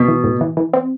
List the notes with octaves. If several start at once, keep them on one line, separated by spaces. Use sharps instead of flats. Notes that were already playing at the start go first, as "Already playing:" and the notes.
Already playing: B2
E3
A2
E3
E3
C4